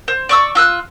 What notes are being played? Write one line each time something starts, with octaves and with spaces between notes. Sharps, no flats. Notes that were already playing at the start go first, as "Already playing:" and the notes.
C5
D5 C#6 E6
F4 E6 F#6